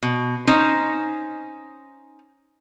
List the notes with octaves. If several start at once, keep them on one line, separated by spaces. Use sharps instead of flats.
B2
C#4 D#4 C5